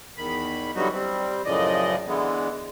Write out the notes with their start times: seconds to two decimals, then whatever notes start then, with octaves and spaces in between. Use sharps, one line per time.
0.17 E2 D#3 B5
0.75 D3 E3 F#3 G3 D#4 F#4
0.93 G3 C4
1.45 F#2 A2 C#3 F3 D5 D#5
2.07 D3 E3 G#3 B3